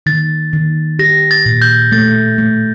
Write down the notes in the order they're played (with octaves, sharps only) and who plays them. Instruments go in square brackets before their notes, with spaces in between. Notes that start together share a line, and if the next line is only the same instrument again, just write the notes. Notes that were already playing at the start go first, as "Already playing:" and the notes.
[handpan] D#3 [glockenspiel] A6
[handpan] D#3
[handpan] G4 [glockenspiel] A#6
[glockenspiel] A6
[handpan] A#2
[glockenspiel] G6
[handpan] A3 [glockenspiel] A6
[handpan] A3